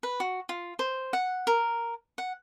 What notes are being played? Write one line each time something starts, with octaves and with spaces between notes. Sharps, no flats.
B4
F#4
F4
C5
F#5
A#4
F#5